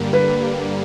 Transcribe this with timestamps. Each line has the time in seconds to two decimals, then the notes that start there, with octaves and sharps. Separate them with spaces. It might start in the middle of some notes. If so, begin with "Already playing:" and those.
Already playing: G2 D3 G3 A#3
0.13 B4